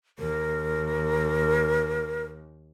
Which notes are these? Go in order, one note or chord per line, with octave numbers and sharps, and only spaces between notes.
D#2 A#4